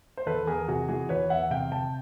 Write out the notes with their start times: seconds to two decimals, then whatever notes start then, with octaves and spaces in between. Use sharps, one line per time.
0.17 C5
0.26 E2 A4 B4
0.47 E2 G#4 A#4
0.68 C3 F#4 G#4
0.89 E3 F#4 G#4
1.09 E2 B4 C#5
1.30 E2 E5 F#5
1.50 C3 F5 G5
1.72 C3 G5 A5